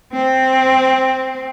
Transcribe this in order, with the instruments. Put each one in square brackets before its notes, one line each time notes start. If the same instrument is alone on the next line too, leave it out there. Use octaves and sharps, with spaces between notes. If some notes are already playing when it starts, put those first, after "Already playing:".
[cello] C4